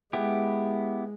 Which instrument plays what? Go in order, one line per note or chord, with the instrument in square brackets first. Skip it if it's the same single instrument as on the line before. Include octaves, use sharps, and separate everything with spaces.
[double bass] G#3 [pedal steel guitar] B3 E4 G4